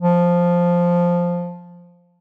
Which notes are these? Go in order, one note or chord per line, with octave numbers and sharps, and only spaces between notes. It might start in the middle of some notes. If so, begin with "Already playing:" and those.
F3